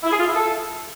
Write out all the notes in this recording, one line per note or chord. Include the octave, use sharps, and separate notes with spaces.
E4
G#4
F4
E4
A4